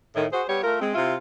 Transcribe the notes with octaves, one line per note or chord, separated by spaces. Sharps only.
A2 D#3
F#4 G#4 C5
G3 B3 G4 C#5
A3 F4 A#4
G#3 C4
C3 E4 F4